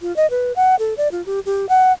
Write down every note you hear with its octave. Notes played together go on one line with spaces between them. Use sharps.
F4
D#5
B4
F#5
A4
D5
F4
G4
G4
F#5